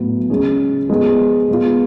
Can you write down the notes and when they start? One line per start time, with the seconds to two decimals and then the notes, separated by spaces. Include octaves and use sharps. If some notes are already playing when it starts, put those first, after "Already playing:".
Already playing: A2 F#3 B3
0.30 C#3 G#3 C#4 G#4
0.89 F3 G#3 B3
1.49 G#3 B3 F4